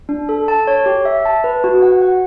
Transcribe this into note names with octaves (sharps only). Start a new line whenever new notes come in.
D4
A4
A5
C#5
G4
E5
A5
B4
F#4
F#5
F#5